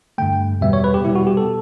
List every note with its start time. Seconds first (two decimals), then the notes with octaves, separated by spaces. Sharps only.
0.18 G2 D3 A3 G5
0.61 E2 B2 G3 B3 E5
0.73 C#5
0.84 B4
0.94 G4
1.05 B2 G3 B3 E4
1.15 F#4
1.27 G4
1.37 A4